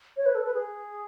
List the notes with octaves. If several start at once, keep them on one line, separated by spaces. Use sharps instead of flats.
C#5
B4
A4
B4
G#4